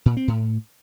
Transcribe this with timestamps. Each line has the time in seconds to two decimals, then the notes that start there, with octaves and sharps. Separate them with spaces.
0.06 A#2
0.17 C4
0.28 A2